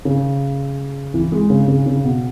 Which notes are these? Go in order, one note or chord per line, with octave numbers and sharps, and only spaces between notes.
C#3
E3
G#3
C#3
C#3
C#3
B2